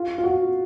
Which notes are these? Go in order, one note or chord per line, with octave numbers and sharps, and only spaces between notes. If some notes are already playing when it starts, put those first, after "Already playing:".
Already playing: F4
F4
F#4